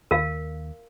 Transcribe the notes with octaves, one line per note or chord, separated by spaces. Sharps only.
D#2 A#4 F5